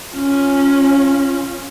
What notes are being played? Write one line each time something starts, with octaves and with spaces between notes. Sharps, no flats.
C#4 F4